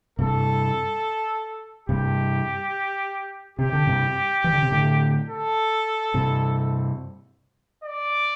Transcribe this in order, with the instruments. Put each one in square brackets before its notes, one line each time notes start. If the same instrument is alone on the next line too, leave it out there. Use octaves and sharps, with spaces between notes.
[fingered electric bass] G2 C3 [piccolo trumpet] A4
[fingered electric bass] G2 C3 [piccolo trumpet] G4
[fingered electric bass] C3 [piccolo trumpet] G4
[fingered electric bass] D3
G2 C3
E3
D3
C3
A2 D3
[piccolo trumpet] A4
[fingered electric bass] G2 C3
[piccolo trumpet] D5